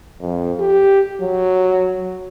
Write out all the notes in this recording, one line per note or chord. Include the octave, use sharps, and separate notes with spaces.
F2
G4
F#3